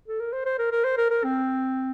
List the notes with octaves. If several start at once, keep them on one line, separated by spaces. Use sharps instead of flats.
A4
A#4
C5
C5
A#4
A#4
C5
A#4
A#4
C4